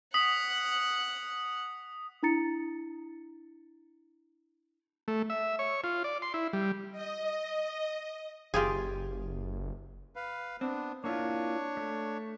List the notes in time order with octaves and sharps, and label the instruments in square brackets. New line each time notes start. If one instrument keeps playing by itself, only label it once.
[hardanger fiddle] F#5 [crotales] D#6 [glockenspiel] B6 F#7
[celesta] D4 E4 A#5 A6 C#7
[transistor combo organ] A3
E5
C#5
F4
D5
C6
E4
G3
[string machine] D#5
[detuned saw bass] F#1 [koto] F4 G4 G#4
[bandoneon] B4 F5
[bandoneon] B3 D4 [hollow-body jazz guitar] C4
[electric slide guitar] A#3 E4 F4 [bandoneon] D4 C#5
[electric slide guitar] A3